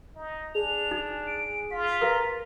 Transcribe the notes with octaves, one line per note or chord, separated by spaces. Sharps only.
D#4
D4 G#4 F7
D#4
D7
F4 B6
A#4 B4 F5 A#5